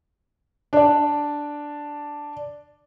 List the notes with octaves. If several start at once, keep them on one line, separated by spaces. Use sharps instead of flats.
D4 D5